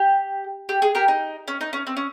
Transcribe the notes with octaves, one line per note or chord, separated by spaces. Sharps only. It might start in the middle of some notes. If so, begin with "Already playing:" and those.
Already playing: G4
G4
G#4
G4 A#4
D#4
C#4
D#4
C#4
C4
C#4